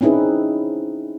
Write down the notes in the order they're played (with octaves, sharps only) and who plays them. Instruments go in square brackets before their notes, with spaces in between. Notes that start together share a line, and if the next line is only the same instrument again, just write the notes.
[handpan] C4 C#4 D#4 E4 G#4 B4